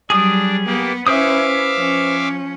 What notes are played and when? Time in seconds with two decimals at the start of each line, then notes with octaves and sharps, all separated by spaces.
0.10 F#3 G3 D4 G#4 D#6
0.67 A#3 B3 G4
1.07 C#4 E4 B4 C5 E5 F5 D6 D#6
1.77 F3 C#4